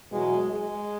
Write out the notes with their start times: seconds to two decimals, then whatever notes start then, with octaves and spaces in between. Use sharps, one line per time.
0.10 E2 B2 F#3 G#3
0.46 G#3